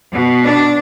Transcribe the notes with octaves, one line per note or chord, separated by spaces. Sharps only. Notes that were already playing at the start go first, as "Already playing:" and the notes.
B2
D4